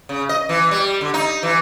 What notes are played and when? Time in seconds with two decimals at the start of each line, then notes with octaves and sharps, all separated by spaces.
0.09 C#3
0.29 D#5
0.49 E3
0.71 G3
1.01 D3
1.14 D#4
1.43 E3